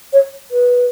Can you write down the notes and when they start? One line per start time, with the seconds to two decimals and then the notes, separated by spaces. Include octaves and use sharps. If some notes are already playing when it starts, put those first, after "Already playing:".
0.13 C#5
0.51 B4